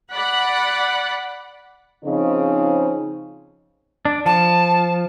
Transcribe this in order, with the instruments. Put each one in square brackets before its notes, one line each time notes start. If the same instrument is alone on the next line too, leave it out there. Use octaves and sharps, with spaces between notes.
[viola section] D5 F#5 B5
[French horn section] C#3 F3 C4 D#4
[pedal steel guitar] D4
[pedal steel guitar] F3 [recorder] A5